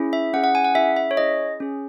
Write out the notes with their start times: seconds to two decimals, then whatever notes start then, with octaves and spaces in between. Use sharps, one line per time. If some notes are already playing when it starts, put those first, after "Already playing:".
Already playing: C#4 E4 G#4
0.13 E5
0.33 C#4 E4 G#4 F#5
0.44 F#5
0.55 G#5
0.65 F#5
0.75 C#4 E4 G#4 E5
0.97 E5
1.11 C#5
1.17 C#4 E4 G#4 D#5
1.60 C#4 G#4